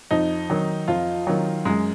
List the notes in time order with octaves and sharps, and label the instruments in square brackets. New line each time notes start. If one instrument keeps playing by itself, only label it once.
[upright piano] F2 [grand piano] D#4
[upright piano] D#3 F#3
[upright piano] F2 [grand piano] F4
[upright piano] D#3 F#3
[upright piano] F#2 [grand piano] G#3